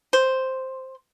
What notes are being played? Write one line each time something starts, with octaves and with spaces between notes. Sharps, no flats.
C5